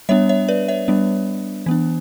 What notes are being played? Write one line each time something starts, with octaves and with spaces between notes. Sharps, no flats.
G3 B3 D4 C#5 E5
C#5 E5
B4 D5
C#5 E5
G3 B3 D4
E3 B3 D4